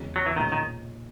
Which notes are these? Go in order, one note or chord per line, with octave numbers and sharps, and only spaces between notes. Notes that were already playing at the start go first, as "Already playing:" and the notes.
Already playing: E2 C#3 G#3 C#4 F#4
F#3
E3
B1 A#2 D#3 G#3 C#4
D#3